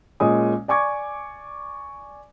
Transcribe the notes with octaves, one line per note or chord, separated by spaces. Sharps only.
A#2 G#3 C#4 D#5 G#5 D#6
D5 G#5 C#6 D6 G#6